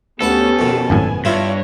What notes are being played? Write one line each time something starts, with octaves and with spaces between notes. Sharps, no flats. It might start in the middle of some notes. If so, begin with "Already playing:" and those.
D2 B3 C#4 G4 A4 B4 F#5
F2 B2 D#3
G#1 F#2 A2 B3 G#5
G2 E4 F4 C#5 E5